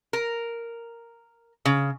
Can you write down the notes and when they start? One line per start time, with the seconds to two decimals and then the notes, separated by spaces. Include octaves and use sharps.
0.13 A#4
1.65 C#3